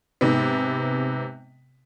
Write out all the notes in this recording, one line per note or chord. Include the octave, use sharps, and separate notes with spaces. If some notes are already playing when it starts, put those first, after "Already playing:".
G#2 C3 B3